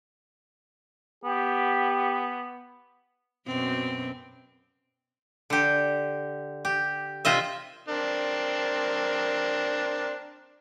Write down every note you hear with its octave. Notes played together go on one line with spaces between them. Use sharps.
B3 G4
F#2 B2 C4
D3 G4
G4
C3 F4 D#5 E5
C4 D4 A#4